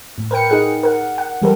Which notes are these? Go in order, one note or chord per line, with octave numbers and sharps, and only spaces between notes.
A2
A#4 B4 G5 C#7
D#4 G#4 F#5
A#4 F#5
F#5
E3 G3 G4 A4 A#4